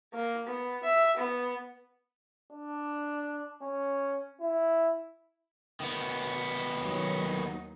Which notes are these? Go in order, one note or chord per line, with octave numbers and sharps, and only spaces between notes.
A#3
B3
E5
B3
D4
C#4
E4
D#3 B3
D#2 F#3 D#4